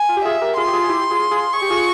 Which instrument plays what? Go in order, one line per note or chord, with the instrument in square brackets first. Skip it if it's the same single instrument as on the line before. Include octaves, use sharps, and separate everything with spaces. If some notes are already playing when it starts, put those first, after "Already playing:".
Already playing: [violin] G#5
[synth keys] F4
G4
[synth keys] F4 G#4 [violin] E5
[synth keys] G4 A#4
[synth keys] F4 G#4 [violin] C6
[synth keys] G4
F4 G#4
G#4
E4 G4
F4 G#4
F4 G#4
[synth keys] G#4 [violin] C#6
[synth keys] G4
F4 G#4